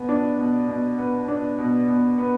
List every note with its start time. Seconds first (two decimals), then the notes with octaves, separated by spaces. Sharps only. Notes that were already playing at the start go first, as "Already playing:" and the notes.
Already playing: B2 B3
0.09 D4
0.39 B2
0.68 B2
0.98 B3
1.28 D4
1.58 B2
1.88 B2
2.18 B3